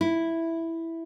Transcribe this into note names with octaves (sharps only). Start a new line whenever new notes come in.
E4